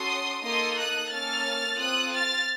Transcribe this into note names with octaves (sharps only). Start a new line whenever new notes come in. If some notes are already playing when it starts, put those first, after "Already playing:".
Already playing: C#4 F#4 A4 C6 D#6
A#3 D#4 A4 C6 D#6
D#6 F#6
A#3 C#4 A4 F6 A6
C4 F4 A4 D#6 F#6
F6 A6